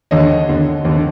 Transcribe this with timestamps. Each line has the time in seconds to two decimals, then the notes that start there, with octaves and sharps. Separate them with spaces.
0.11 D#2 D3 C#5 D#5
0.49 D#2 D3
0.85 D#2 D3